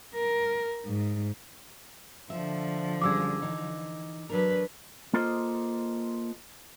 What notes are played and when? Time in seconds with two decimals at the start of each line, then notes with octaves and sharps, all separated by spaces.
0.15 A#4
0.86 G#2
2.30 D3 F3 E5
3.02 F#2 G3 G#4 D6 E6 G#6
3.42 E3 D#4
4.29 F#3 D4 A#4 B4
5.13 A#3 F4 A4 C5 D#5